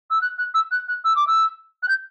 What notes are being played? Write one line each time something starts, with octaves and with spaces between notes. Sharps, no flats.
E6
F#6
F#6
E6
F#6
F#6
E6
D6
E6
F#6
G6